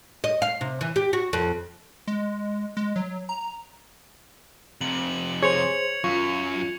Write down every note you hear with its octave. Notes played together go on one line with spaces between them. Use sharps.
D#5
F5
C3
E3
G4
F#4
F2
G#3
G#3
F#3
A#5
F2 C3 F#7
G#4 C5 C#5 G#6 C#7 F7
F#2 F4 C#6